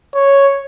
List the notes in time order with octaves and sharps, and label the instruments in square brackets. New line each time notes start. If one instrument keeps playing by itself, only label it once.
[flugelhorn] C#5